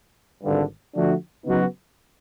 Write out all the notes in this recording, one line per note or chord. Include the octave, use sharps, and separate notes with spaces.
G#1 G2 D3
D3 F3 A3 D4 F#4
C#3 F#3 B3 D#4 F#4